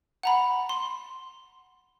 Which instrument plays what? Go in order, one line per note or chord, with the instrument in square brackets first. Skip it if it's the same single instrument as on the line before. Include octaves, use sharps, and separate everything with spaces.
[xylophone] F#5 A#5 B5
C6